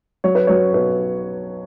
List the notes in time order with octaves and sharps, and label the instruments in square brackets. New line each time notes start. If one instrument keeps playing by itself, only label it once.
[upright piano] F#3 C#5
B4
F#3 C#5
B1 B4